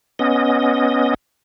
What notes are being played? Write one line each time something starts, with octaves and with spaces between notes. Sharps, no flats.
B3 C#4 D#5